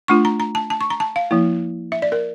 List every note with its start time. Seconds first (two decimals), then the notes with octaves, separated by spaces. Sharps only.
0.08 A3 D4 F4 C#6
0.25 A#5
0.40 A#5
0.55 A5
0.70 A5
0.81 C#6
0.90 A#5
1.00 A5
1.16 F5
1.31 F3 A#3 E4
1.92 E5
2.02 D5
2.12 A#4